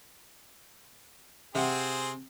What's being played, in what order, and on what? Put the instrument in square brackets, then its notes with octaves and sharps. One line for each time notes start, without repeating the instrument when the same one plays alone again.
[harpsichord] C3 [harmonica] C4 G#4 C5 [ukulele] E5 F#5